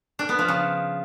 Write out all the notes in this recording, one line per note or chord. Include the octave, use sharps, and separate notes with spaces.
D4
B3
F3
C#3